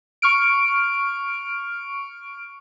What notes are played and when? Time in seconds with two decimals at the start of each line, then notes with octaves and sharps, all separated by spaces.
0.22 C#6 F6 D7